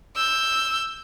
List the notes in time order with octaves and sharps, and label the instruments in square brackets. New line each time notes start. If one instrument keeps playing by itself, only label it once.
[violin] E6 G6